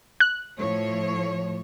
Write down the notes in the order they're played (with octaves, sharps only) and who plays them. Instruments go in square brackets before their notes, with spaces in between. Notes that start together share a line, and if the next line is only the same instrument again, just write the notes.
[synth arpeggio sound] F#6
[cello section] A2 F3 C#5